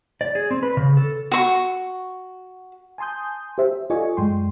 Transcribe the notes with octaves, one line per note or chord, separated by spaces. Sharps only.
D5
G#4
C4
B4
C#3
A4
F#4 C#6
G#5 A5 C6 D#6 G6
G4 C5 E5
F4 A4 D5 D#5 G#5 C#6
F#2 G#3 G5 C6